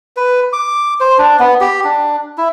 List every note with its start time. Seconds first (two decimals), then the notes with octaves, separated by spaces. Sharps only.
0.16 B4
0.53 D6
1.00 C5
1.18 D4
1.39 B3
1.61 G4
1.84 D4
2.38 E4